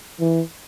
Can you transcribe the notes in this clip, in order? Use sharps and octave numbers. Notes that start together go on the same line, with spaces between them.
E3